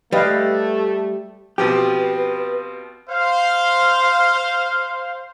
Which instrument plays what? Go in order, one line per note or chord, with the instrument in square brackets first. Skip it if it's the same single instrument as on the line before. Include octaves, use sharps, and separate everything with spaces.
[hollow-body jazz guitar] G3 [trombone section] A3 [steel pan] B4 D#5 F5
[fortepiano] B2 F3 C4 [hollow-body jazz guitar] G4 [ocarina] B4
[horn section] C5 F5